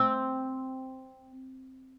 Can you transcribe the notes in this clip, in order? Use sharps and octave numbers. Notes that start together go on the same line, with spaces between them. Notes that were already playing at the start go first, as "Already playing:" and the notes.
Already playing: C4